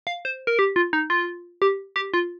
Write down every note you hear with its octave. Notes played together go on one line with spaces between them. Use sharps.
F5
C5
A#4
G4
F4
D#4
F4
G4
G4
F4